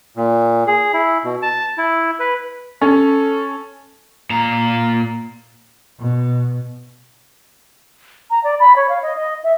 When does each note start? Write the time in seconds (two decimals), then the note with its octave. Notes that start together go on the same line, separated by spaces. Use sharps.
0.17 A#2
0.67 G#4
0.94 E4
1.24 B2
1.42 A5
1.78 E4
2.20 B4
2.81 C#4 A4
4.30 A#2 A#5
6.00 B2
8.31 A#5
8.44 D5
8.60 B5
8.76 C#5
8.89 F5
9.02 D#5
9.16 D#5
9.43 E5